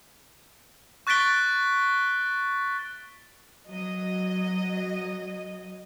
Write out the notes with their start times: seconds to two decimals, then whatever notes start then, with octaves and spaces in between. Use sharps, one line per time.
1.07 C#6 F#6 A6 B6 D7 G7
3.68 F#3 D#5